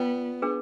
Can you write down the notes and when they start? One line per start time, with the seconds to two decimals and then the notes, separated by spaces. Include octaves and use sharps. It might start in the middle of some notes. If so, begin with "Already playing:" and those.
Already playing: B3 F4 B4 D5 G5
0.42 D4 G#4 B4